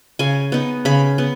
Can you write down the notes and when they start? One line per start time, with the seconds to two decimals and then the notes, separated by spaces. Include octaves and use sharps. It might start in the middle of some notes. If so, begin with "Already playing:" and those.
0.19 C#3 G#5
0.52 B3 D#4
0.85 C#3 B5
1.18 B3